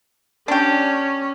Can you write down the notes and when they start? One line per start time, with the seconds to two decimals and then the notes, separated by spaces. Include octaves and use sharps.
0.48 C#4 D4 G4